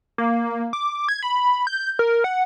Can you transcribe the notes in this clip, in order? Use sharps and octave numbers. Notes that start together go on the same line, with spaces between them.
A#3
D6
G#6
B5
G6
A#4
F#5